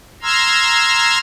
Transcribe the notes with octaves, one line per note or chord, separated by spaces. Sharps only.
A#5 C6 E6 F6 G#6